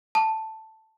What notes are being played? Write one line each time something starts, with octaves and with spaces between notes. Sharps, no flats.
A5